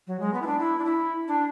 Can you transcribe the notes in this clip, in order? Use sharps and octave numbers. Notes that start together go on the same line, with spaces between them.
F#3
G#3
B3
E4
D4
E4
D4
E4
D4